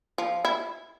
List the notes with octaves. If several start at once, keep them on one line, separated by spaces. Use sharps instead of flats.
F3
E4